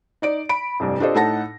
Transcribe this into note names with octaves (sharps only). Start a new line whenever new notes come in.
D#4 D5 D7
B5 D7
F1 C2 G2
D4 F4 G4 A4 C5 D#5
A2 D#4 A4 F#5 A5 A#6